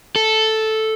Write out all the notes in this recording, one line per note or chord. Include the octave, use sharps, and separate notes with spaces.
A4